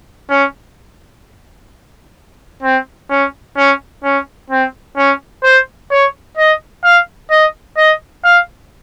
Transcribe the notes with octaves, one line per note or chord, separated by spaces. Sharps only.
C#4
C4
C#4
C#4
C#4
C4
C#4
C5
C#5
D#5
F5
D#5
D#5
F5